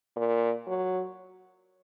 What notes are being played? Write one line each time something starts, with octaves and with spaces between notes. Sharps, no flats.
A#2
F#3